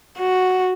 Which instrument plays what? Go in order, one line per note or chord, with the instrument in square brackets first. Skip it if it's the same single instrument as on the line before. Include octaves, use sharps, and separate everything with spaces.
[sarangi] F#4